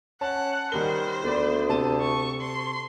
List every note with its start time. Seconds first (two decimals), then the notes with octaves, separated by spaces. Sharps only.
0.21 C#4 F#5 A5
0.72 D#3 G3 A#4 C5 G7
1.23 D2 A3 B3 D5
1.68 C3 A5 D#7
2.01 C#6
2.41 C6